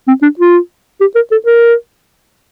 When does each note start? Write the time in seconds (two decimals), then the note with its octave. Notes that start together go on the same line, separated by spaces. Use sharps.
0.08 C4
0.22 D4
0.39 F4
1.01 G4
1.15 A#4
1.31 A4
1.46 A#4